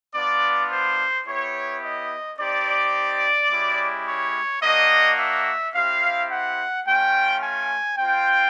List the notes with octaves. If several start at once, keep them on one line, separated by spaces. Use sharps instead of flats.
B3 D4 F4 D5
C5
B3 E4 G4 C#5
D#5
C4 D#4 G4 D5
G#3 C#4 E4 G4
C#5
A#3 D4 F#4 D#5
E5
C4 E4 G4 F5
F#5
A3 C#4 F4 G5
G#5
C4 F4 G5